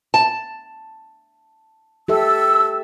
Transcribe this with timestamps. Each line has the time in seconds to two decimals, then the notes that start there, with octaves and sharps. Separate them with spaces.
0.14 A5
2.08 G4 A4 E5 E6